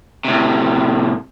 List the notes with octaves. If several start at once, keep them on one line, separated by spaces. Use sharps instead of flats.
A2 C3